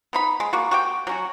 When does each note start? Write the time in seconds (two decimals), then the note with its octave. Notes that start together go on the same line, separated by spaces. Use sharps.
0.13 B3 D#4 B5
0.40 G#3
0.53 A#3 F#4
0.71 F#4 G4 G5
1.07 F#3 C#4 F#4